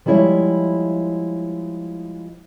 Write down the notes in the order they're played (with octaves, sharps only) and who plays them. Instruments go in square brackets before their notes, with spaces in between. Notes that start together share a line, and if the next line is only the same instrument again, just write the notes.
[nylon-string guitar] F3 G3 G#3 E4 C#5 E5